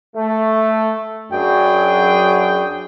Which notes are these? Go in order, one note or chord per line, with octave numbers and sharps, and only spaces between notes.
A3
F#2 F#3 D4 G#4 G5